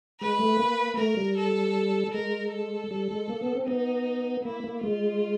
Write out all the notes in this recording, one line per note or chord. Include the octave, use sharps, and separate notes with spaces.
G#3 B4
A3
A#3
A3 A#4
G3
A4
G#3 A#4
A4
G3
G#3
A#3
B3
C4
B3 D#4
A#3 E4
A#3
G#3 F4